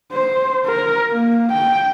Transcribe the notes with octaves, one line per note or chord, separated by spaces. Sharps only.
C5
A#4
A#3
G5